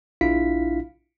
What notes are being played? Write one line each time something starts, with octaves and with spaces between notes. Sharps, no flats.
A#1 D4 E4 F4 F5 B6